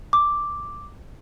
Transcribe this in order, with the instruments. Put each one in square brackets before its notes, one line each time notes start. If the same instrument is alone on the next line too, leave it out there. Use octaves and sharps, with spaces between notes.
[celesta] D6